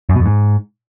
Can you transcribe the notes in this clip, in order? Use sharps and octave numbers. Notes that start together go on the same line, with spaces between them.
F#2
B2
F2
G#2